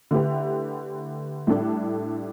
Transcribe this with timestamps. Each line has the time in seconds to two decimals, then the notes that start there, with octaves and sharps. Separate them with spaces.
0.11 D3 A3 E4 G4 B4
1.47 A2 G3 D4 A4